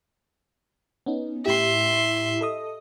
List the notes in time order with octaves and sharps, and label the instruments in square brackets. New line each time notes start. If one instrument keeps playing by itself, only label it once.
[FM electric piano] B3 C#4 D#4
[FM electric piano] A2 E4 G4 [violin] E5 C6
[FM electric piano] A4 D#5 D#6